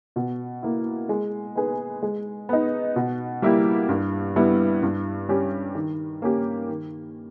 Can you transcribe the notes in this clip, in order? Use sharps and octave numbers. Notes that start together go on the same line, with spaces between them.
B2
A#3 E4
G#3
B3 D#4 G#4 B4
G#3
B3 D#4
B2
G3 A#3 E4 G4
G2
G3 B3 E4
G2
G3 C#4 G4
D#3
A#3 C#4 G4
D#3